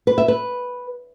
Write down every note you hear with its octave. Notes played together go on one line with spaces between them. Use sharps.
B4
E5
B4